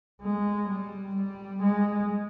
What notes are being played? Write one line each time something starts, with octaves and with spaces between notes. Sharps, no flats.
G#3
G3
G3
G#3